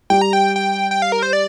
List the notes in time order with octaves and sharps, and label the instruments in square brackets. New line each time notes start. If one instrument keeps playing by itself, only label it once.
[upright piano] G3 [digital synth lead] G5
[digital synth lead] A#5
G5
G5
G5
F5
A#4
C5
D5